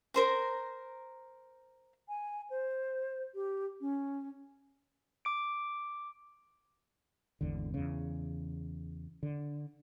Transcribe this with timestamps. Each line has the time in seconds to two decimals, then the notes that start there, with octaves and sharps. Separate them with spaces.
0.14 A#4 C5 A#5
2.08 G#5
2.50 C5
3.35 G4
3.81 C#4
5.25 D6 D7
7.41 G#1 E2 D3
7.74 E2 C#3
9.23 D3